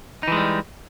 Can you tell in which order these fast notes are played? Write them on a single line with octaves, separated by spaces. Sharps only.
D#4 E3 G#3 G3